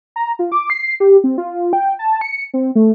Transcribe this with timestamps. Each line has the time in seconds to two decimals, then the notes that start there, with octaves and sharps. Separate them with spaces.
0.16 A#5
0.39 F4
0.52 D6
0.70 C7
1.00 G4
1.24 C4
1.38 F4
1.73 G5
1.99 A5
2.21 C#7
2.54 C4
2.75 A3